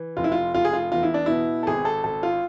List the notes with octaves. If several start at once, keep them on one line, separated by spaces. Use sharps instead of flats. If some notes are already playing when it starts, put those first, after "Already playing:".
Already playing: E3
F1 F4
E4
F4
F1 F4
G#4
F4
E2 F4
E4
D4
B2 E4
A4
G#1 G#4
A4
G#1 A4
F4